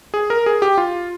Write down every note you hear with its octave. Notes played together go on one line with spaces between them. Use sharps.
G#4
A#4
G#4
G4
F4